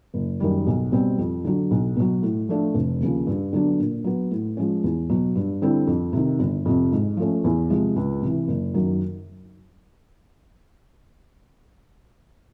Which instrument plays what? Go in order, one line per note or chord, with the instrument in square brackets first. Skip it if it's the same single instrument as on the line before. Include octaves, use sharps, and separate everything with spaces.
[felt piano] F#1
F#2 D#3 G3
B1
B2 G3 C4
F2
D3 F#3
B1
B2 F#3
A2
F3 A3 D4 F4
F1
D#2 C#3 F3
G2
D3 F#3 B3 D4
A#2
F#3 B3
A2
F3 G#3 C#4
E2
B2 F#3
G2
D3 G3 C4 E4
F2
C3 D#3
G1
F2 C3
G#2
F3 A3 C#4
E2
C3 F3 G#3
C#2
C3 E3
F#1
F#2 D#3 F#3